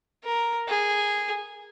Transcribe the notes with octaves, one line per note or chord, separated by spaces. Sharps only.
A#4
G#4